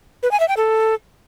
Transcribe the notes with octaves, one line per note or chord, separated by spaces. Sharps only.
B4
G#5
E5
G5
A4